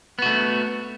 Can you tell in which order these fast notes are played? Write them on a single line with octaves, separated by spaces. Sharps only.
B3 F#4 A3